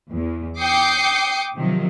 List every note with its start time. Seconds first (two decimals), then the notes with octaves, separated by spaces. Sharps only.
0.11 E2
0.59 G5 D6 D#6 G6 C7 C#7
1.56 C3 D#3 F3 F#3